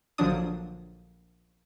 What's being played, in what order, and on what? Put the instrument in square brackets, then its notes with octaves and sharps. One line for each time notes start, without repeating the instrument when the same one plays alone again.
[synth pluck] A#1 D3 F3 F#3 D4 D#6